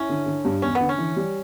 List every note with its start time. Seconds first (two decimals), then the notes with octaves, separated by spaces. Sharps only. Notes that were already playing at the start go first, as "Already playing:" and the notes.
Already playing: C#4 E4
0.09 D3
0.26 D3
0.45 G2
0.62 E2 C#4
0.75 B3
0.80 D3
0.89 C#4
0.98 E3
1.16 G3